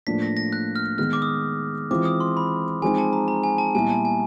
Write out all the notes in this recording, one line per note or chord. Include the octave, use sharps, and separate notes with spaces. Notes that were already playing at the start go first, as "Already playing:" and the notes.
A2 F3 A#3 D4 B6
A#6
A#6
F#6
F6
D#3 G#3 B3 F6
D6
D#6
E3 G#3 C4 F4 D6
D#6
C6
B5
F3 G#3 C4 D#4 G#5
A5
A#5
A#5
G#5
A5
A#2 G3 B3 E4 G#5
A5
G#5